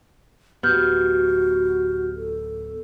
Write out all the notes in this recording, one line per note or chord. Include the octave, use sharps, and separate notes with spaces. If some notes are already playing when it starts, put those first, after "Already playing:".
D1 B3 F#4 G4 F6 G6
A4